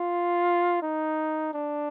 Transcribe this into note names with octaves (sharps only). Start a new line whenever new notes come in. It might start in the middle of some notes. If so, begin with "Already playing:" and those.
Already playing: F4
D#4
D4